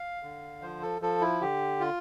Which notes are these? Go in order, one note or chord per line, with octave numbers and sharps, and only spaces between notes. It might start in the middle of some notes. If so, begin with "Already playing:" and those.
Already playing: F5
D3
F3 C5
A4
F3 A4
E4
D3 G4
F4